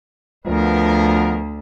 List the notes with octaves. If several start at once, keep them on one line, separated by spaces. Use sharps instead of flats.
D2 F3 B3 A#4